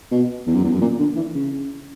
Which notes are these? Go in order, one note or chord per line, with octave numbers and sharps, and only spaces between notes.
B2
E2
F#2
E2
F#2
A#2
D3
E3
C#3